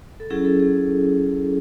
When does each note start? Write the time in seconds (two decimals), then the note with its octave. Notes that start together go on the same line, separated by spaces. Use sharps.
0.20 A4
0.30 F#3 C#4 E4 G#4
0.45 A4
0.60 G#4